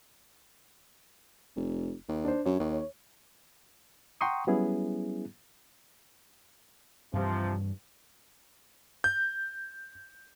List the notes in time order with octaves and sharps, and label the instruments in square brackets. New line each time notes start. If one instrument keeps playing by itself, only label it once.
[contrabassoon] F1
D#2
[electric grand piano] D4 C5
[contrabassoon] F#2 [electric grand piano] C#5
[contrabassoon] D#2
[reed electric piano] F#5 G5 A#5 C6 C#6 D#6
F#3 G3 B3 C#4 E4 G#4
[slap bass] G2 E3 [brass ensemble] C3 F3
[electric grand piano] G6